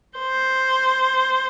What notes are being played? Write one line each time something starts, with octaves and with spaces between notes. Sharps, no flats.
C5